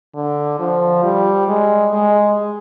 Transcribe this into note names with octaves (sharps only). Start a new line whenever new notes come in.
D3
F3
G3
G#3
G#3